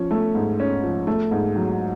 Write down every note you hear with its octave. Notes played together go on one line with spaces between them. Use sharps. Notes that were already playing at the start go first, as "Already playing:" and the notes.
Already playing: F3 C#4
A3
G#2
C#4
F3
A3
G#2
F#3